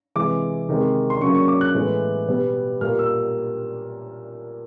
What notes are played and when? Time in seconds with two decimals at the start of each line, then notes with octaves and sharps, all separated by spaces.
0.16 C3 E3 G#3 D6
0.69 C3 D#3 G#3
1.10 C6
1.21 C#3 F#3 A#3 C#6
1.35 C#6
1.48 D6
1.61 F#6
1.75 A2 E3 G#3 B3
2.28 B2 G3 B3
2.81 A#2 G3 A#3 F6
2.99 E6